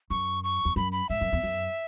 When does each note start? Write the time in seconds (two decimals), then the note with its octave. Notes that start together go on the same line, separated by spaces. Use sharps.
0.10 F#2 C#6
0.44 C#6
0.65 E2
0.76 F#2 B5
0.92 B5
1.09 G#2 E5
1.21 F#2
1.33 E2
1.44 F#2